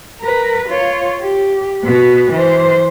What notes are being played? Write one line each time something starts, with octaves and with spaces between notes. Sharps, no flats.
A#4 B4
F4 C#5
G4
B2 B4
E3 C5